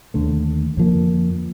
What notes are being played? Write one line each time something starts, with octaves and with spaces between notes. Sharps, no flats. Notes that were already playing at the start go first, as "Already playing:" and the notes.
D#2 D3 A3
F2 D3 F3 A#3